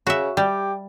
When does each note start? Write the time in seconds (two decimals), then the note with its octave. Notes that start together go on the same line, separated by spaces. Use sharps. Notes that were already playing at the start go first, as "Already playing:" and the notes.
0.07 C#3 F#4 E5
0.37 G3 G4